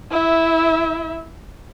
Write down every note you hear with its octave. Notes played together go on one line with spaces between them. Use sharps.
E4 E5